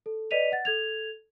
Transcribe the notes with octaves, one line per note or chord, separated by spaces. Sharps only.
A4
B4 D5 D#5 B6 D#7 F7
F#5 A6
A4 G#6 F7